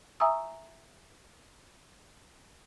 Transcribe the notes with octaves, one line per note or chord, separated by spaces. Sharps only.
E5 G#5 A#5 C#6 D#6 E6